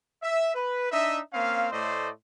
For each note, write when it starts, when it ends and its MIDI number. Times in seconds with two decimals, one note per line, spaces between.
0.22 0.53 76
0.55 0.91 71
0.92 1.20 62
0.92 1.20 63
0.92 1.20 75
0.92 1.20 76
1.33 1.67 58
1.33 1.67 60
1.33 1.67 61
1.33 1.67 77
1.71 2.10 45
1.71 2.10 57
1.71 2.10 72
1.71 2.10 74
1.71 2.10 75
1.71 2.10 84